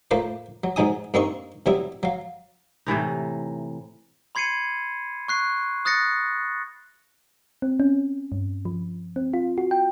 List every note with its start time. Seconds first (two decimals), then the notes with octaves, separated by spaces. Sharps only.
0.11 A2 A#3 F4 B4 C5
0.64 F#3
0.76 G#2 B2 F#3 D#4 G#5 D#6
1.14 G2 A#3 C4 D#4 C6 C#6
1.66 C3 F#3 G3 B3 E4
2.03 F#3 F5
2.86 A2 C3 E3 D#4
4.35 B5 C6 G#6 C7 C#7 D#7
5.28 C#6 F#6 C7
5.85 D#6 F#6 A6 A#6 C#7
7.62 C4
7.80 C#4
8.32 G2
8.65 F3
9.16 C4
9.34 F4
9.58 F#4
9.71 G5